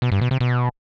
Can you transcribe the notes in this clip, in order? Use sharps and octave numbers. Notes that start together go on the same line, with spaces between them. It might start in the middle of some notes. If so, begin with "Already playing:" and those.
B2
G2
B2
C3
B2